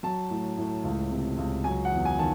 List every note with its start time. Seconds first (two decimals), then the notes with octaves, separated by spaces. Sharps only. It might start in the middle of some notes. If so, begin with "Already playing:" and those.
0.03 F#3 A5
0.30 A2
0.58 A2
0.84 C#2
1.11 C3
1.37 C#2
1.64 F#3 G#5
1.85 F#5
1.92 E2
2.05 G#5
2.18 D#3 A5